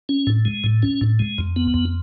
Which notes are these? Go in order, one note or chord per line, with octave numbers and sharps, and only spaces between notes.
C#4
A2
G#3
A2
C#4
A2
G#3
F2
B3
F2